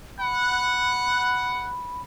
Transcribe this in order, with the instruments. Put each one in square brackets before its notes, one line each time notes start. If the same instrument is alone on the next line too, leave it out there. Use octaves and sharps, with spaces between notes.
[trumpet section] F#5 [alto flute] B5